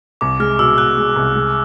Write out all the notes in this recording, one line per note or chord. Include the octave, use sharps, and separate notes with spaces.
C2 D6
G#3 F6
B2 E6
B2 F#6
G#3
C2
G#3